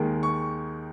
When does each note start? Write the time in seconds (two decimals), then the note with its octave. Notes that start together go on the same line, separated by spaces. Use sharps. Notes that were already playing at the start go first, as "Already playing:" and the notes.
Already playing: D#2 D#3 G#3
0.23 C#6